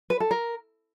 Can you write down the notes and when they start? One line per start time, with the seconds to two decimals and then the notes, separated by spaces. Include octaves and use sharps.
0.10 B4
0.20 A4
0.31 A#4